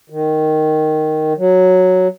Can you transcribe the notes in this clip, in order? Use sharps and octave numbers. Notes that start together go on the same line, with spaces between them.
D#3
F#3